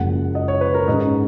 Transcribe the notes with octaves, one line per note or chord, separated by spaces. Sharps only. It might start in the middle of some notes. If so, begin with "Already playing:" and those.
Already playing: F#1 F#2 F3 G#3 F#5
D#5
C#5
B4
A#4
G#2 D#3 G#3 C#4 D#5